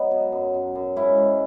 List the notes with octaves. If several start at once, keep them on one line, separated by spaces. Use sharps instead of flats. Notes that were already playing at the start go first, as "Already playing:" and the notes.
Already playing: F#3 B3 D#4
B2
F#2
F#2
F#2
G#2 C#4 E4
G#2